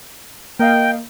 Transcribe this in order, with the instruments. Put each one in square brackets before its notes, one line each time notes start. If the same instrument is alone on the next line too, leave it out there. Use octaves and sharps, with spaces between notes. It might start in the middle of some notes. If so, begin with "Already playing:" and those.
[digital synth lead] A#3 [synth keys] A#4 D#5 F5 [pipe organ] G5